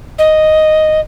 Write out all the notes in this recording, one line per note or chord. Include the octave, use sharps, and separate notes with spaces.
D#5